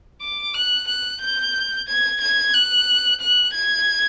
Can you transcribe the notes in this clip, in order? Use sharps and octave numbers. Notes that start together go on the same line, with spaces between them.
D6
F#6
F#6
G6
G#6
G#6
F#6
F#6
G#6